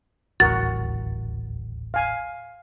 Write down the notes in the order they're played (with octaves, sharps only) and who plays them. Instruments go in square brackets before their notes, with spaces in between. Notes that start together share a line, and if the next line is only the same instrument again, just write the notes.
[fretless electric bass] D#1 A1 D2 [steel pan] F#4 A#4 [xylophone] A6
[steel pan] F5 G#5